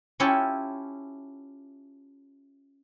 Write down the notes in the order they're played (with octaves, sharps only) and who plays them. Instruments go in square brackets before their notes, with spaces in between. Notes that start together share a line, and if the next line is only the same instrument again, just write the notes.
[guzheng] C#4 E4 F4 G4 A4 C#5